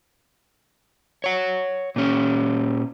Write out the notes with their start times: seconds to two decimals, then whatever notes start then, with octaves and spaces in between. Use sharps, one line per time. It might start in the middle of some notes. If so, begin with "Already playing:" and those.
1.24 C#5 F#5
1.96 A#2 C#4